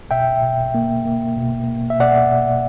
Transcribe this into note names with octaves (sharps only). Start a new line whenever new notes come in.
B2 E5 G5
B2
A#3
A#3
B2
A#3
E5
B2 D5 F#5
B2